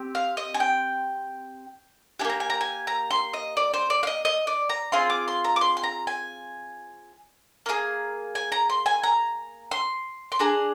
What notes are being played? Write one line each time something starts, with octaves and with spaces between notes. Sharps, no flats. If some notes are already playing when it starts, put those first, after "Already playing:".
Already playing: C4 G4
F5
D#5
G#5
G5
A#3 D4 G4 G#5
A#5
G#5
A#5
G#5
A#5
C6
D#5
D5
C5
D5
F5
D#5
D#5
D5
A#5
C4 F4 G#4 C6
D6
C6
A#5
D6
C6
C6
A#5
G#5
A#3 D#4 G#4
G#5
A#5
C6
G#5
A#5
C6
C6
D4 G#4 A#5